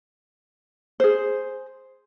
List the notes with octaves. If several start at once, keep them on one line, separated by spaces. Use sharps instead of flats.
G#4 C5